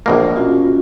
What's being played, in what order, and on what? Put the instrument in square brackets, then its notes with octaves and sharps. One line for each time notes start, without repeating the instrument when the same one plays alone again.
[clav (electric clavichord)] A#1 B2 A#3
[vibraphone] C#4 F4 F#4